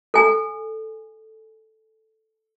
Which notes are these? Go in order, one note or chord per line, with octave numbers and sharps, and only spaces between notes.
A4 G#5